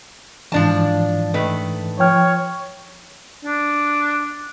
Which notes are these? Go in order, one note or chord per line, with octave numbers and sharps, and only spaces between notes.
G#2 E3 F3 D4 A5
D#3 A3 B4
F3 C#5 G5 F6
D4